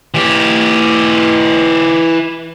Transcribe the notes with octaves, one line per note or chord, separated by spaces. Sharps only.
E3 G4